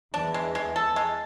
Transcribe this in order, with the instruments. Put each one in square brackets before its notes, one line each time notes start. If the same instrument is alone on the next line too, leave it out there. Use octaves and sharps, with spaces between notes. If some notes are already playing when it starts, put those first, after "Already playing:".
[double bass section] E2 E3 [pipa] D4
[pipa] G#3
G#3
A4
G#3